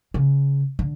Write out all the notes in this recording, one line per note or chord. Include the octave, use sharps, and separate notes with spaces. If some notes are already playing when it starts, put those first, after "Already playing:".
C#3
D3